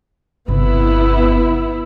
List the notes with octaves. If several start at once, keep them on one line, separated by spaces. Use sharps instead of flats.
G1 C3 B3 E4